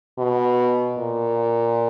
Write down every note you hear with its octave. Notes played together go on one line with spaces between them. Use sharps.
B2
A#2